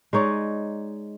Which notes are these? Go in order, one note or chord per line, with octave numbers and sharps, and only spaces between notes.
G#3 D#4 C#5 D5